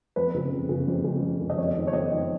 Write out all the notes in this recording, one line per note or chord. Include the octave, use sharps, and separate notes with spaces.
F2 B4
C#3
F2
C#3
F2
C#3
F2
C#3
D#5
F2 C#5
D#3
C#5
F2 D#5
D#3